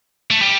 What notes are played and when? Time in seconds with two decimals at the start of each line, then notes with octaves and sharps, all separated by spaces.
0.30 A3
0.41 G3